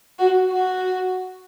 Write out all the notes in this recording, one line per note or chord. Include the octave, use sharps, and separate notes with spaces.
F#4
F#4